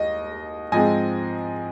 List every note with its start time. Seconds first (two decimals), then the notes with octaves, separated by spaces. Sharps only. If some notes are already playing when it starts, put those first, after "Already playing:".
Already playing: D#2 D#5
0.72 G#2 F3 G#3 C4 D#5 G#5